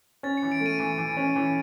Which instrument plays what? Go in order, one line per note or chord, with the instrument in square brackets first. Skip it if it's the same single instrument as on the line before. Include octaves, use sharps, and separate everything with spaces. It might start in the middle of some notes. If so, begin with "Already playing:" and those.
[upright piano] C#4 [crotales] A6
[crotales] C#7
[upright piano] E3
[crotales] D7
[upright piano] A3
[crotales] D#7
[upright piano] E3 [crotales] D#7
[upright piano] E3
C#4
E3